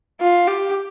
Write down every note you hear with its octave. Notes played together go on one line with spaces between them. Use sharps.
F4
G4